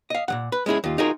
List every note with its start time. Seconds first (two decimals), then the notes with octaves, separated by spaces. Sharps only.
0.10 D#5 F5
0.28 A#2 D#3 F#5
0.52 B4
0.66 G#3 C#4 E4 G#4
0.84 D#2 F4
0.98 D#4 F4 F#4 G#4 A#4